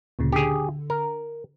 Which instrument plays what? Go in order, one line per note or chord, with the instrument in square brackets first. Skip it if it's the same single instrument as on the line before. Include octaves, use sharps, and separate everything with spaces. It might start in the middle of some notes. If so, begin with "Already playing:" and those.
[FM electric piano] D2 A#2 C#3
[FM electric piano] D3 [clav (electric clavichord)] G4 G#4
[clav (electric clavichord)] A#4